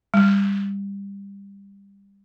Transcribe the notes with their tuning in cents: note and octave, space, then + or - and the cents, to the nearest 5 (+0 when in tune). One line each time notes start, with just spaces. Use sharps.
G3 +20